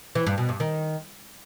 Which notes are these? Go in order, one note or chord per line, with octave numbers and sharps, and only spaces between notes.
E3
G2
B2
G2
D#3